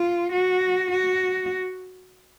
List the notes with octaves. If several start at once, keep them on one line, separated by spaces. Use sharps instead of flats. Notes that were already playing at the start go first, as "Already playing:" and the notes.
Already playing: F4
F#4
F#4